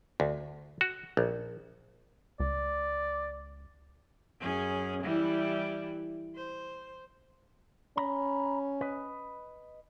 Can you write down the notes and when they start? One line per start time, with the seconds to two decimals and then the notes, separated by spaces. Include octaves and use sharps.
0.20 D2
0.81 F#4
1.17 A#1
2.40 C#2 D5
4.40 F#2 C#4 G#4
5.03 E3 G3 E4
6.36 C5
7.97 C#4 A#5 B5
8.81 B4 D#5